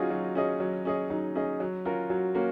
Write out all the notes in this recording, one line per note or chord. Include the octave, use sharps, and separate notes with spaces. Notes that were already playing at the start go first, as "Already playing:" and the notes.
Already playing: F#3 C#4 D#4 F4 F#4 G#4 D#5
F#3
C#4 G#4 D#5
F#3
C#4 G#4 D#5
F#3 D#4
C#4 G#4 D#5
F#3
C#4 F4 F#4 A#4
F#3 F#4
A#3 C#4 F#4 A#4